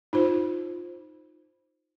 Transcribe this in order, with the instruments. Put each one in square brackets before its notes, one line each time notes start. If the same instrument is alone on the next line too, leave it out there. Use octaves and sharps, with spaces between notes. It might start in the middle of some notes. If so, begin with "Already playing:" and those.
[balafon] D#4 F4 C5